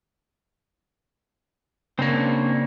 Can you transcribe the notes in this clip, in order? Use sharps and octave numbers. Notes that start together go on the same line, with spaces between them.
C#3 A#3 C4 D4 C#5